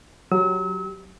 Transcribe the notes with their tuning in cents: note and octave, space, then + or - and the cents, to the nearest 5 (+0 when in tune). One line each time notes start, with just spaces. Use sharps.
F#3 +0 G4 -10 E6 -40